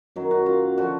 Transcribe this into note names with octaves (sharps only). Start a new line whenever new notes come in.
F#2 D#3 F#3
F#4
F4
D3 F3 F#4